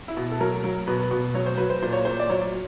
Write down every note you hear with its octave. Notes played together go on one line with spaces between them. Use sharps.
E4
B2
A4
F#3 A#4
F#3
B2 B4
B2
F#3 C#5
C5
F#3 B4
C5
A#2 C5
C#5
A#2 C5
D5
F#3 C#5